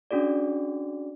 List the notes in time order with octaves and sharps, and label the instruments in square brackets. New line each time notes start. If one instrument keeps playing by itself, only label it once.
[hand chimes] C#4 D4 F#4 G#4 D5